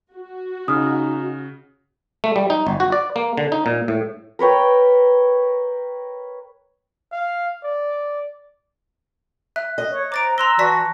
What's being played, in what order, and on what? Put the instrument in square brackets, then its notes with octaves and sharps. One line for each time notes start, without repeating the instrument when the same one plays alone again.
[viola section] F#4
[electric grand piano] C#3 [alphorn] D#4 [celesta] D#6 F6
[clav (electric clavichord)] A3
G3
D#4
G1
F#4
D5
A#3
D3
D#4
A#2
A2
[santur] A#4 B4 C#5 G5
[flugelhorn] F5
D5
[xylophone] E5 [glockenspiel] F#6
[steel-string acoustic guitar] D#5
[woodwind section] C#5
[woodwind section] C5 A#5 [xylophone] D6 A6 D7
[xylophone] A#5 C6 G7 [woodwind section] E6 [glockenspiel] F#6 A#6
[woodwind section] E3 F#4 [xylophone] D5 A5 B6